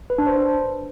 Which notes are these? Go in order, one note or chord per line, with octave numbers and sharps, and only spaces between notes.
B4
D4
C5